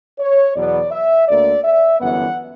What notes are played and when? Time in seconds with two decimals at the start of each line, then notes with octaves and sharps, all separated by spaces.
0.18 C#5
0.55 E2 B2 F#3 B3 D5
0.91 E5
1.28 D2 D3 A#3 D5
1.64 E5
2.00 G1 F#2 E3 B3 F#5